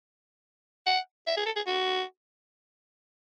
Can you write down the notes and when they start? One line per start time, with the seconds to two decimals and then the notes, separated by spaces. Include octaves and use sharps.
0.86 F#5
1.27 E5
1.37 G#4
1.46 A4
1.56 G#4
1.66 F#4